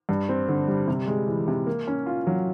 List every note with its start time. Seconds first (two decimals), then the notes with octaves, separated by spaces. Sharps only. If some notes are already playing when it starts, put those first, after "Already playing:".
0.09 G2
0.29 C4
0.48 D3
0.68 G3
0.88 C3
1.07 G#3
1.28 E3
1.48 C3
1.67 A#3
1.87 C#4
2.06 F4
2.27 F#3